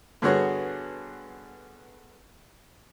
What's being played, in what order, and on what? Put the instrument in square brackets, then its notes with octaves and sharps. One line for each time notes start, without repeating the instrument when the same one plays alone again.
[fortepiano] G2 D3 B3 F#4 G#4 C#5